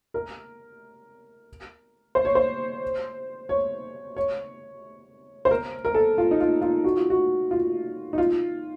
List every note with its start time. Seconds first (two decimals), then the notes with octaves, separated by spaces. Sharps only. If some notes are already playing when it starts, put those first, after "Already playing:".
0.14 A#4
2.15 C5
2.25 C#5
2.35 C5
3.49 C#5
4.17 C#5
5.45 C5
5.51 A#4
5.85 A#4
5.94 A4
6.18 F4
6.31 D#4
6.40 F4
6.61 F4
6.84 F#4
6.97 F4
7.10 F#4
7.51 F4
8.13 D#4
8.18 F4